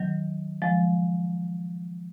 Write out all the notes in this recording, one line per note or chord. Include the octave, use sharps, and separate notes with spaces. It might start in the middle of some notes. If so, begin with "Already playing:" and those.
Already playing: D#3 F#3
F3 G#3